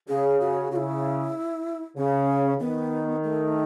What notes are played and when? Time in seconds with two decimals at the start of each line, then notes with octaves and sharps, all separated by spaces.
0.09 C#3 G#4
0.40 F#4
0.71 C#3 E4 F#4
1.97 C#3 C#4
2.60 D#3 B3
3.23 A3